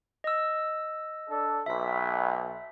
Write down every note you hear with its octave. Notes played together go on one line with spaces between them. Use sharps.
D#5 E6
D4 A4
B1 E5 B6